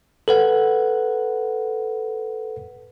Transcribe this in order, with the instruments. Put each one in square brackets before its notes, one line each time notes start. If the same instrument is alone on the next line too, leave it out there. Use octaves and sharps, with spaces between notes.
[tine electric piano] A4 B4 F#5